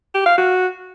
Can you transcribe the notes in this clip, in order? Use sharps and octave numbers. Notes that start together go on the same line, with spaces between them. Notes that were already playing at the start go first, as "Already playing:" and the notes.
G4
F5
F#4